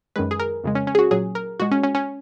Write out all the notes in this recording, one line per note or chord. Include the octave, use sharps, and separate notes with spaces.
F#2 D#3 G#3 B4
G#4
A#4
F2 C#3 G#3
C#4
C#4
G#4
F#4
A#2 F#3 G#4
A#4
A#2 G#3 F#4
C#4
C#4
C#4